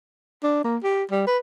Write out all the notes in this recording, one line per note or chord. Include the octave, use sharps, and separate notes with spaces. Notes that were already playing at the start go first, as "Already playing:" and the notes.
D4
A#3
G4
G3
B4